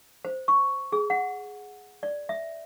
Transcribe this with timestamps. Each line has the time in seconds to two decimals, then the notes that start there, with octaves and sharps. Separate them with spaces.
0.25 C5
0.48 C#6
0.92 G#4
1.10 F#5
2.03 D5
2.29 E5